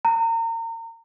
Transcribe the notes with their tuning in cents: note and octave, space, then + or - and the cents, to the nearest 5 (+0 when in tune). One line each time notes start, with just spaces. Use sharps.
A#5 -35